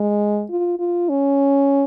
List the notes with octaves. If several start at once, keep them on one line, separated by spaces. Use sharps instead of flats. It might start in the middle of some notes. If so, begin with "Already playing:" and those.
Already playing: G#3
F4
F4
C#4